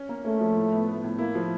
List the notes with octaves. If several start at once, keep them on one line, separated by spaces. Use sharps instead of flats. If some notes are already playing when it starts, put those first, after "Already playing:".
Already playing: C#4
A#3
A3 C#4
F3
A2
B3
B3
A2
A#3 E4
F3